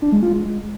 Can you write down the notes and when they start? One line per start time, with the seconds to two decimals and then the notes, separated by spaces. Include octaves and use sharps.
0.02 D4
0.12 G#3
0.23 F4
0.33 G#3